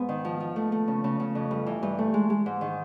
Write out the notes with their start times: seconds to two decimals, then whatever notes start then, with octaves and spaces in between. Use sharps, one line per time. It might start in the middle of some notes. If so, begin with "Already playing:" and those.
Already playing: G#2 B3
0.09 D#3
0.25 F3
0.40 F3
0.56 A3
0.72 A3
0.88 C#3
1.04 C#3
1.20 C#3
1.35 F2
1.51 G2
1.66 E3
1.83 G2
1.98 A3
2.14 G#3
2.30 G#3
2.46 G#2
2.61 D#3